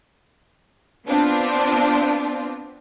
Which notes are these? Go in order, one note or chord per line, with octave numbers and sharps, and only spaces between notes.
B3 C4 D4 F4